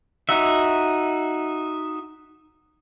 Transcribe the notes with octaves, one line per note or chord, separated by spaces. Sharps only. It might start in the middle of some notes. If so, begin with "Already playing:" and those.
D#4 F#4 E5